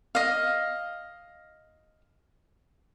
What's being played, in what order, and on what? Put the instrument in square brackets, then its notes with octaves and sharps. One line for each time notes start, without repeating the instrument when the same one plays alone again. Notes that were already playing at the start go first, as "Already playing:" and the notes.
[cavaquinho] D#5 F5